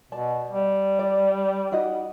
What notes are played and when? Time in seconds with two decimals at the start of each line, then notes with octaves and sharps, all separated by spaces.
0.12 B2 D5 A5
0.51 G3
0.99 D5
1.71 D#4 F#4 D#5